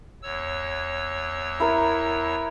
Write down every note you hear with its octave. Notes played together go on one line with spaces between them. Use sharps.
E2 C#5 E6
E4 A#4